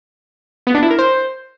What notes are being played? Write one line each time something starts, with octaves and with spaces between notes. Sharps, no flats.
B3
D4
E4
A#4
C5